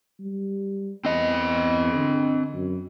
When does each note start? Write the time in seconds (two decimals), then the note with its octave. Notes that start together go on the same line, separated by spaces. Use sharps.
0.20 G3
1.05 E2 C4 D#5
1.95 D3
2.54 F#2